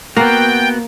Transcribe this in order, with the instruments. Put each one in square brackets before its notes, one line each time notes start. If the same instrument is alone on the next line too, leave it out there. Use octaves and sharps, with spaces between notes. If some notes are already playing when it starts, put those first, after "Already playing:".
[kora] A#3 [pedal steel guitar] B3 F#4 [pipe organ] G5